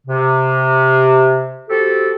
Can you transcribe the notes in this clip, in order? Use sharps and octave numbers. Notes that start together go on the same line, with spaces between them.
C3
C4 F#4 G4 A4